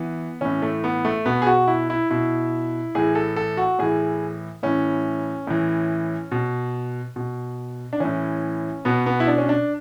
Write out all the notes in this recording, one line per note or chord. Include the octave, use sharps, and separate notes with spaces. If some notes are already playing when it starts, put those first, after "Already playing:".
Already playing: E3 B3
A2 E3 C#4
A3
B3
A3
B2 B3
G#4
F#4
E4
E4
B2 E4
A2 E3 G#4
A4
A4
F#4
A2 E3 G#4
A2 E3 C#4
A2 E3
B2
B2
D4
A2 E3 C#4
B2 B3
B3
E4
D4
C#4
D4